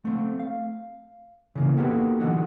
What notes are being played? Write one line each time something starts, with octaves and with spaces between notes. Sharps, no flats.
A3 C4
F5
C#3 E3 A#3
A#3 B3 D#4 F#4 G4 A4
D3 E3 F#3 D#4 F#5